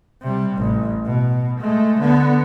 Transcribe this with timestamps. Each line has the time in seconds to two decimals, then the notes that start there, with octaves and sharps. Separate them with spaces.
0.22 C3 G3
0.57 A1
1.05 B2
1.60 G#3 A3
1.99 D3 B3